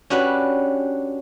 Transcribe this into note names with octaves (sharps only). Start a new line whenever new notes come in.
C#4 D4 F#4 G4 B4 D5